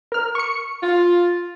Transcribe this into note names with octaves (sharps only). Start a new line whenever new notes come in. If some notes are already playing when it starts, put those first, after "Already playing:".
A#4 F6
C#6 C#7
F4